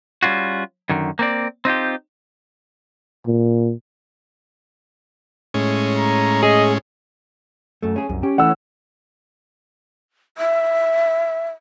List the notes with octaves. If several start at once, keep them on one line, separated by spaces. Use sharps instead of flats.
G3 C#4 F4 F#4
F#2 D3 D#3
A#3 C4 D5
C4 D#4 F4 G4
A#2
A2 G#3 C#4
A#5
G#4 D#5
F#2 A3
C#4 G#4
C2 F#2
C#4 G4
E3 A3 F#5 E6
E5